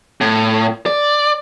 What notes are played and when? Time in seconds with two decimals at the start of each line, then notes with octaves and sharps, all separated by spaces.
0.21 A2
0.86 D5